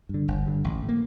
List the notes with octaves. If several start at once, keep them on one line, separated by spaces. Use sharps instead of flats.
G2 D3
G1
G2 D3
A1
A2
A#3